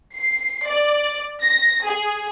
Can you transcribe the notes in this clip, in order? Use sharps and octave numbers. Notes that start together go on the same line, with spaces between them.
C7
D5
A#6
G#4